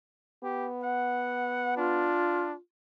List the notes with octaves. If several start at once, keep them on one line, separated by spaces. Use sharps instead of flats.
B3 G4
F#5
D4 F4